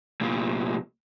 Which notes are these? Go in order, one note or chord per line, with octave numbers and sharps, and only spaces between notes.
C2 A#2